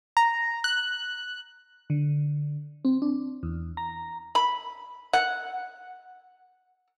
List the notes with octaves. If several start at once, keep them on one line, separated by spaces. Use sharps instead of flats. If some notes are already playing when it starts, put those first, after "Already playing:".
A#5
F#6
D3
C4
D4
E2
A#5
B5
F#5